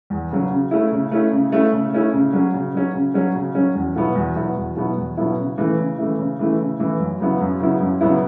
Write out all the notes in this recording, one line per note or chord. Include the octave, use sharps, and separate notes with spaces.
E2
C#3 F#3
C#3
A3 C#4 E4
C#3
A3 C#4 E4
C#3
A3 C#4 E4
C#3
A3 C#4 E4
C#3
F#3 C#4
C#3
F#3 C#4
C#3
F#3 C#4
C#3
F#3 C#4
E2
B2 F#3 B3 E4
E2
B2 F#3 B3 E4
E2
B2 F#3 B3 E4
E2
B2 F#3 B3 E4
C#3
E3 A3 E4
C#3
E3 A3 E4
C#3
E3 A3 E4
C#3
E3 A3 E4
F#2
C#3 F#3 B3 E4
F#2
C#3 F#3 B3 E4
F#2
C#3 F#3 B3 E4